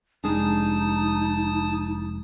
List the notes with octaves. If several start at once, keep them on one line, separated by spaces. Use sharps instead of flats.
F1 G#3 D4 D#4 A5 D#6